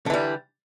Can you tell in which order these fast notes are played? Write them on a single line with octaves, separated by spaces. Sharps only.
D3 E3 G3